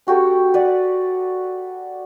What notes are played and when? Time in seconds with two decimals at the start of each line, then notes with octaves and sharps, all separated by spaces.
0.07 C#4 F#4 G4 A4
0.54 B4 D5 F#5